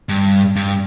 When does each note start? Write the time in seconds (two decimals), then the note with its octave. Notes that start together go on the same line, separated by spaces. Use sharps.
0.09 G2
0.56 G2